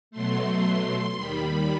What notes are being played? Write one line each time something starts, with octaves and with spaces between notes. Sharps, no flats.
B2 F#3 A3 C6
D#2 D#3 G3 B5